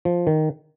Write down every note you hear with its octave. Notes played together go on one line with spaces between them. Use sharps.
F3
D#3